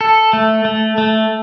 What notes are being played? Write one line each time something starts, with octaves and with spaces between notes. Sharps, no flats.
A4
A3
A3
A3